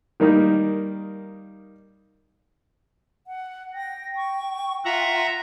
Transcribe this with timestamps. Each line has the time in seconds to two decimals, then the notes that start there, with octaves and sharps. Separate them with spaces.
0.20 D#3 G3 A#3 D#4
3.27 F#5
3.74 G5 A#6
4.16 C#6
4.85 F4 E5 F#5 A#5